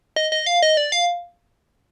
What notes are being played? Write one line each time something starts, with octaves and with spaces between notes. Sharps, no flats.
D#5
D#5
F5
D#5
D5
F5